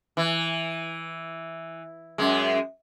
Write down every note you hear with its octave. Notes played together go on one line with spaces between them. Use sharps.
E3
F#2 G#3